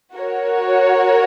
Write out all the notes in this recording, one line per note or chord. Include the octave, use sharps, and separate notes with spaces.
F#4 A#4 C#5